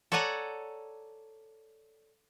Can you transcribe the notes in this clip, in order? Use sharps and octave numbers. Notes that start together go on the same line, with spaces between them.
A4 C#5 D5 F#5 G#5 A#5